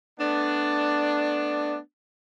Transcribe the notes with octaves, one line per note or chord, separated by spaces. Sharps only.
A3 B3 D4